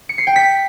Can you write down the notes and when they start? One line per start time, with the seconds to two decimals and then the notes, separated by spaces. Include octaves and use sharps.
0.09 C#7
0.18 C7
0.27 G5
0.36 B6